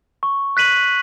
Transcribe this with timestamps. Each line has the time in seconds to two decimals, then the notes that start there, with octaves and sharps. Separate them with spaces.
0.23 C#6
0.57 F#6 B6 D#7 F#7